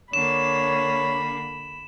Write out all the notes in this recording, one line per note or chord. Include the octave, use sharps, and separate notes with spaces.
D3 A#3 C#5 B5 E7